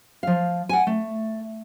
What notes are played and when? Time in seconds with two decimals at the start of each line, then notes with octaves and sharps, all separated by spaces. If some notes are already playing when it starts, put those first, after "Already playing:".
0.23 F3 F5
0.69 F#5 G#5
0.87 A3